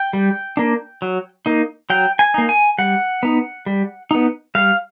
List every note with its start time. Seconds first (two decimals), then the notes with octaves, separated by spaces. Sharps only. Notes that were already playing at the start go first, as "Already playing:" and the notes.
Already playing: G5
0.13 G3
0.57 A#3 D4
1.02 F#3
1.46 A#3 D#4
1.90 F#3 G5
2.19 G#5
2.34 A#3 D#4
2.49 G#5
2.78 G3 F#5
3.23 B3 D#4
3.66 G3
4.11 B3 D#4
4.55 G3 F5